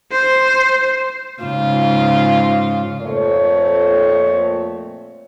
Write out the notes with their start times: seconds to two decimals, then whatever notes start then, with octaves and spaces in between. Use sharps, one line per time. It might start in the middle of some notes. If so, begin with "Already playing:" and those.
0.12 C5
1.42 G#2 C#3 F4
3.02 F2 A#2 A3 C4 C#5